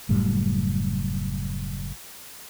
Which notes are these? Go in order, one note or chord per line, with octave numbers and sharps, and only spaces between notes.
F#1 F#2 A2 G3